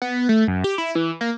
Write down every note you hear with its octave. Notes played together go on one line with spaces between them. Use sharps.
B3
A3
F#2
G4
E4
E3
A#3